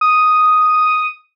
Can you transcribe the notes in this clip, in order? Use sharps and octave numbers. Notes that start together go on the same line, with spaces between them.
D#6